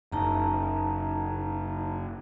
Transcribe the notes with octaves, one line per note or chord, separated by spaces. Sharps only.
F#1 D#4 A5 A#5